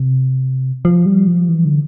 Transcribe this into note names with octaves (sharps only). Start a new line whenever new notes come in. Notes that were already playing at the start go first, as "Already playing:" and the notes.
Already playing: C3
F3
G3
F3
E3
D3